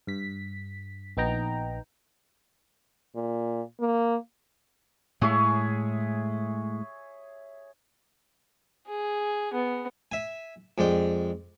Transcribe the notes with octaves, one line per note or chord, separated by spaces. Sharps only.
G2 B6
A#1 B3 D#4 G5 A#5
A#2
A#3
A2 G#3 G#4 C#5 E5
G#4
B3
E5 G#5
F2 G#3 D5 G5